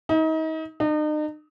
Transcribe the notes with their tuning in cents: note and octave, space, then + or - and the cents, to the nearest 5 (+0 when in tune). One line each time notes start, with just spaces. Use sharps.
D#4 +35
D#4 -40